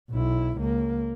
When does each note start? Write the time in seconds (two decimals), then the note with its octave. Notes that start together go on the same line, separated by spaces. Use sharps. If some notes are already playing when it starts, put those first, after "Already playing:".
0.10 B1 E4
0.58 C#2 A#3